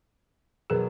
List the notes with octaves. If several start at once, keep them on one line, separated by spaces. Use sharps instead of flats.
B2 F#3 B3 G#4 A#4